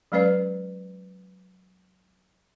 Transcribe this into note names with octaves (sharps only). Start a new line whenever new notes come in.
F#3 G#3 C#4 B4 D5